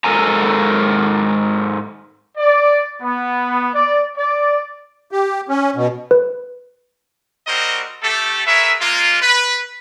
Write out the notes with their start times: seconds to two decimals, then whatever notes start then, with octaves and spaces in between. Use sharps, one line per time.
0.04 G#2 A4 A#4 G#5 A#5
2.37 D5
3.01 B3
3.73 D5
4.17 D5
5.11 G4
5.49 C#4
5.76 B2
6.11 B4
7.47 G3 C4 F#4 A#4 C5 D#5
8.02 A3 G4 A4
8.47 G#4 A#4 B4 C#5 E5
8.81 G#3 A#3 F4
9.22 B4